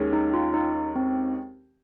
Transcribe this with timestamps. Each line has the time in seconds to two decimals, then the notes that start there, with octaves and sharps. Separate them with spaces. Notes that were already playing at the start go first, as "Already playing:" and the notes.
Already playing: D#2 D#3 G#3 C#4 G#4
0.13 D#4
0.34 F4
0.54 D#4
0.96 C4